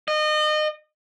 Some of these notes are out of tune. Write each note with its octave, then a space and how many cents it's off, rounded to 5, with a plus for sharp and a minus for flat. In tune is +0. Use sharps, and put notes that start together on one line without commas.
D#5 -30